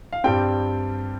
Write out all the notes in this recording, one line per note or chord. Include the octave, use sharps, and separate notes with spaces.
F5
G2 G3 C4 G5